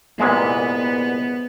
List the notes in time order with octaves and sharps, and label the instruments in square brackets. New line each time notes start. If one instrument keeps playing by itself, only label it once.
[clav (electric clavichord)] C2 A#2 G#3 [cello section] B3